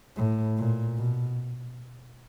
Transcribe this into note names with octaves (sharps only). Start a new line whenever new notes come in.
A2
A#2
B2